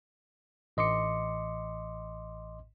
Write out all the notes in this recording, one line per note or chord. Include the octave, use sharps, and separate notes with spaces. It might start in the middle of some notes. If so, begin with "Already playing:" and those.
A1 D#5 C6 D6 C#7